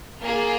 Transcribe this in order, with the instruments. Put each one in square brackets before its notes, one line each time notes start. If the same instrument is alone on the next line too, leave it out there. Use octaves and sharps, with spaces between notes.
[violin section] A#3 F4 G#4